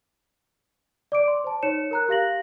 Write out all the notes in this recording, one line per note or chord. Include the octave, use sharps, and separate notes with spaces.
D5 D6 D7
C6
C5 A5
D#4 C#5 C#7 E7
A#4 A#5 F#6
G4 F5 A#6 F#7